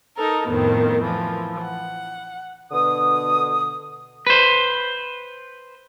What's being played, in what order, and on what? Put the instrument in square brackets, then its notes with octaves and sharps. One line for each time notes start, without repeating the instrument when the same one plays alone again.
[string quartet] D#4 A4 A#4
F2 A2 D#3 B3 C4
E3 F3
F#5
[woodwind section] B2 D3 D#6
[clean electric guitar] B4 C5